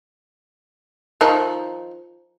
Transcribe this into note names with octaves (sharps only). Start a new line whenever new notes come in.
D#3 F3 D#4